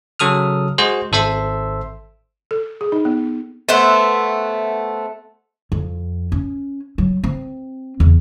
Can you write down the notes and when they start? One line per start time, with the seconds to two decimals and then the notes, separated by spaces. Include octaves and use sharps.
0.20 C#3 F#3 A4 D#6 F6
0.78 G#3 F#4 G#4 C5
1.12 G#1 A4 C5 E5 C6
2.51 A4
2.81 G#4
2.92 D#4
3.05 B3
3.69 A3 B3 C5 E5
5.72 F2
6.32 C#4
6.98 F#3
7.24 C4
8.00 E2